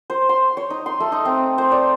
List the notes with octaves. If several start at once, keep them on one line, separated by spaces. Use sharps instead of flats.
C5
C6
C#5
D#4
C6
A3
D#4
C4
C5
D5